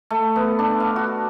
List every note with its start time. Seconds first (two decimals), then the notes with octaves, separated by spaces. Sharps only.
0.10 A3
0.36 B3
0.59 D4
0.80 F5
0.96 F#4